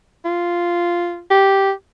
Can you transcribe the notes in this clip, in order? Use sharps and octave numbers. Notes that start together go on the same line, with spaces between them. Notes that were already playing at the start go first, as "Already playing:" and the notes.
F4
G4